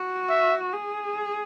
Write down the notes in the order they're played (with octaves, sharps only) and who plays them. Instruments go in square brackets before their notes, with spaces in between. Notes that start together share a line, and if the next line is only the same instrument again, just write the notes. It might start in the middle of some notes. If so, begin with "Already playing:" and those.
Already playing: [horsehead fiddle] F#4
[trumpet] E5
[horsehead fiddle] G#4